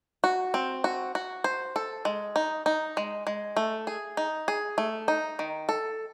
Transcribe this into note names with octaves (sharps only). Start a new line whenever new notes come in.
F#4
C4
F#4
F#4
C5
A4
G#3
D#4
D#4
G#3
G#3
A3
G#4
D#4
G#4
A3
D#4
D#3
A4